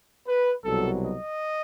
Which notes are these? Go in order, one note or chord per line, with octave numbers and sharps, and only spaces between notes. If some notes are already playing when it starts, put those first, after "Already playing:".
B4
C2 B2 F#3 A4
D#5